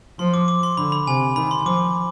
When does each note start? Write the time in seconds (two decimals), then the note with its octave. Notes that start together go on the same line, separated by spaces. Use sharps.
0.19 F3 C6
0.34 D6
0.48 D6
0.63 C6
0.77 D3 B5
0.92 B5
1.07 C3 G#5
1.36 D#3 B5
1.51 C6
1.65 F3 D6